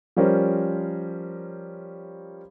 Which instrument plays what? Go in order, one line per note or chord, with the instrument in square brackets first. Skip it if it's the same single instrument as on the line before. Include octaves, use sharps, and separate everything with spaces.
[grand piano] F3 G3 C#4 A#4 C5